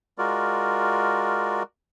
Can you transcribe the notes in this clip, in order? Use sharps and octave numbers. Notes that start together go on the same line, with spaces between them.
G#3 F4 F#4 A#4 D5